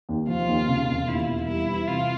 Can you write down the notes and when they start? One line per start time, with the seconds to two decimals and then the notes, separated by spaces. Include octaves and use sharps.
0.09 D#2
0.28 F3 F4
0.49 D#2
0.68 C#3
0.88 E1
1.08 D#2 E4
1.28 E1
1.48 G3 E4
1.68 E3
1.88 C3 F4